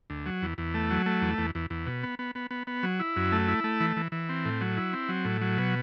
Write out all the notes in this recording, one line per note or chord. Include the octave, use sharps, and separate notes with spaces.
D2
F#3
E2
E2
A3
F#3
A3
E2
E2
E2
E2
B2
B3
B3
B3
B3
B3
F#3
E4
F#2
A3
E4
A3
E3
E3
E3
C4
A2
F#3
E4
C4
F#3
A2
F#3
B2